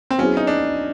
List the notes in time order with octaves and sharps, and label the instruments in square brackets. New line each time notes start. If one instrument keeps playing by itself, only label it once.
[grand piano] C4
[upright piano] F#3 B3 E4 G#4 C5 [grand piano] C#4
[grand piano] D#4
D4